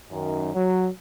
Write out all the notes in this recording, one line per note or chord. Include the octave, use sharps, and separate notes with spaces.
F#2 D#3
F#3